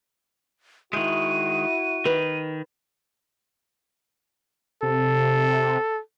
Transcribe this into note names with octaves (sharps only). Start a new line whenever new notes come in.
D#3 G#3 E4 F#4 G6 D#7
D#3 B4
C3 A4